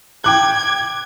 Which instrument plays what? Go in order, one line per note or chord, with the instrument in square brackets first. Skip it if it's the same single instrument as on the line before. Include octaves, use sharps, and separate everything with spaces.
[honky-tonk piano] G5 D6 F#6 [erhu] G#6